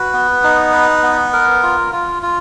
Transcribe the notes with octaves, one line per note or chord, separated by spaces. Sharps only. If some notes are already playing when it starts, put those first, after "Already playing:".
Already playing: F#4 B4
B3
D#4
B4
B3
A#4
F4
F4
F4